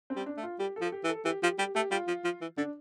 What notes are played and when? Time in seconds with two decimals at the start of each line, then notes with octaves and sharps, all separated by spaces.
0.10 C4
0.16 G3
0.26 D4
0.37 A3
0.43 F4
0.59 G3 G4
0.76 F3 A4
0.92 G4
1.04 E3
1.08 A4
1.25 E3 G4
1.42 F3 G4
1.58 G3 G4
1.75 A3 G4
1.91 G3 F4
2.07 F3
2.24 F3
2.41 E3
2.57 D3 D4